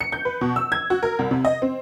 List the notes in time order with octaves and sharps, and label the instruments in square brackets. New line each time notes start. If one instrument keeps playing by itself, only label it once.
[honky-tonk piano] C#7
G6
B4
B2
E6
G#6
F#4
A#4
C2
C3
D#5
C4